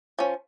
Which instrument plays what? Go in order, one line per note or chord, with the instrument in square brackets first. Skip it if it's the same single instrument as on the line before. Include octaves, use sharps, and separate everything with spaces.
[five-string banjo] F3 C#4